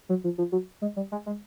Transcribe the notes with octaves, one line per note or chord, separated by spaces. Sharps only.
F#3
F3
F3
F#3
G#3
G3
G#3
G#3